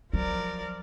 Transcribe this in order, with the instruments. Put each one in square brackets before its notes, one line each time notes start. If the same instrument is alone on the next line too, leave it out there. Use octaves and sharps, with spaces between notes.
[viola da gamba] F3 A#4 D5 [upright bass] F#3